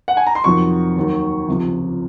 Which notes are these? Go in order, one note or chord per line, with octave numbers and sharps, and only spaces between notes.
F#5
G#5
A#5
C6
F2 C3 D#3 F#3 C#6
D#2 D#3 F#3
C#2 C3 F3